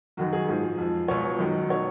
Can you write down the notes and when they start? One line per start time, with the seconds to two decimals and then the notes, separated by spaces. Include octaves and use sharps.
0.17 F#2 D#3 F#3 F#4
0.33 G#4
0.48 G#2 F3 G#4
0.78 F2 F3
1.08 C#2 B2 F#3 C#5
1.39 F#2 D#3 F#3
1.69 B2 F#3 C#5